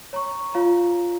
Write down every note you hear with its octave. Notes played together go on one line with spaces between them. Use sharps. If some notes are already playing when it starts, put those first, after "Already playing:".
C#5 A#5 C#6
F4 C#5 F5 A#5